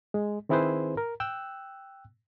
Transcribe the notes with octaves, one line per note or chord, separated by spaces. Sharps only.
G#3
D#3 C4 E4 G#4 B4 C5
A#4
G5 E6 F#6